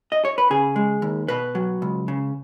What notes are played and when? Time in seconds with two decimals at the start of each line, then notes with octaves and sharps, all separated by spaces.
0.12 D#5
0.25 C#5
0.38 B4
0.50 C#3 G#4
0.76 G#3
1.02 D#2
1.28 B2 B4
1.55 F#3
1.82 C#2
2.08 C#3